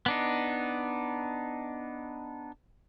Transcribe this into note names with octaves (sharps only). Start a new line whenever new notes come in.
B3 D4 D#4